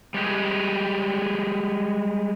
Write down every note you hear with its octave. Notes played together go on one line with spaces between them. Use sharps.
G3 G#3 G4 G#4